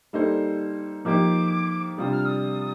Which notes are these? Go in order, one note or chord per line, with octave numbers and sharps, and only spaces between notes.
G3 A#3 D#4 A4 C5
F3 A#3 D#4 G4 C5 D6
C3 G3 D4 F4 D#6
F6
D#6